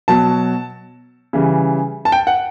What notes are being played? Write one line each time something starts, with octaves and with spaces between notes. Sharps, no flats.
B2 F#3 A5
C#3 E3 G3
A5
G5
F#5